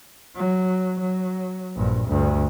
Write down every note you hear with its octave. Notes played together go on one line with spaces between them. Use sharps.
F#3
F#3
A#1 G2
D2 G2